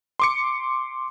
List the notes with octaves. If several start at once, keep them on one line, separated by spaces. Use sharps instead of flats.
C6 D6 C#7